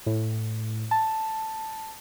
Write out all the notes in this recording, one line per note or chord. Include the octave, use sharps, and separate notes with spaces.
A2
A5